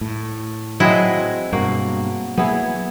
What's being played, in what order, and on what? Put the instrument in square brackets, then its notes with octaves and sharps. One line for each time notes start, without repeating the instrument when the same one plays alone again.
[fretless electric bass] A2
[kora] F#3 C4 D#5 [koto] G#3 E4
[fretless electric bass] G2 B2 [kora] A#3 F#4
[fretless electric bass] F#3 G3 A#3 [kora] B3 E4 G#4